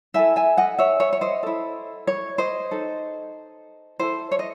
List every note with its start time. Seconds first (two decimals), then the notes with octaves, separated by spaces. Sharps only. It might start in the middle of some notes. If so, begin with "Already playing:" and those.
0.14 E4 A4 E5 G#5
0.36 E5 G#5
0.57 D#5 F#5
0.79 C#5 E5
1.00 C#5 E5
1.13 C#5
1.21 C5 D#5
1.43 E4 A4
2.07 C#5
2.38 C5 D#5
2.71 D#4 A4
3.99 E4 A4 C5
4.32 C#5
4.39 D#5